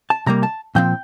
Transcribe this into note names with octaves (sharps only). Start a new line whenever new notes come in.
A5
C3 G3 A#3 A#5
A5
A#2 F3 C4 G5